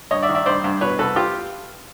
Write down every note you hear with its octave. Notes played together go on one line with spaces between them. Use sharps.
G2 C#5 D#5
D5 E5
D#3
D5 E5
G2 C5 D5
G2
B2 B4 C#5
C2 A4 B4
F4 G4